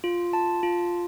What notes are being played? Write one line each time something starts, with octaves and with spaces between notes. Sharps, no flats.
F4
A5
F4